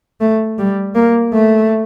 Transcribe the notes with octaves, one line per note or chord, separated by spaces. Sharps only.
A3
G3
A#3
A3